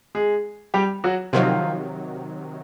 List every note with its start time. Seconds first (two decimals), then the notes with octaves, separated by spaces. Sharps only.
0.15 G#3 G#4
0.74 G3 G4
1.04 F#3 F#4
1.33 C3 D#3 F3 F#3 F4